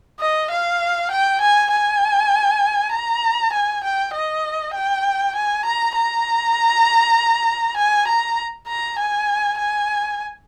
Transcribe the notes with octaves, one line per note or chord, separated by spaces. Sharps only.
D#5
F5
G5
G#5
G#5
A#5
G#5
G5
D#5
G5
G#5
A#5
A#5
G#5
A#5
A#5
G#5
G#5